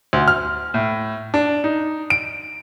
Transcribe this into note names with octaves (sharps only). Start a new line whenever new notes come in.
D2
F6
A2
D4
D#4
D7